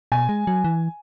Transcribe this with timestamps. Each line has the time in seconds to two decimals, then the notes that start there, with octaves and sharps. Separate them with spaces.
0.12 B2 G#5
0.29 G#3
0.47 F#3
0.64 E3